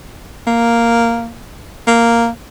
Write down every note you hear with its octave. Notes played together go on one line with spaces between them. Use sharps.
A#3
A#3